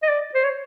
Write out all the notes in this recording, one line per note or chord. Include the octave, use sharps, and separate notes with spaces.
D#5
D5
C5
C#5